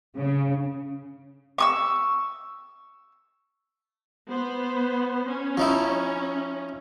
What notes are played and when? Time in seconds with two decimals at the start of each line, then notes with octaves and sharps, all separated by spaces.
0.16 C#3
1.58 C#6 D#6 E6
4.30 B3 C5
5.28 C#4
5.57 F3 D#4 E4